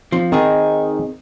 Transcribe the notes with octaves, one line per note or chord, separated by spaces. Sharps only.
F3 C4
D#3 C4 D#4 G#4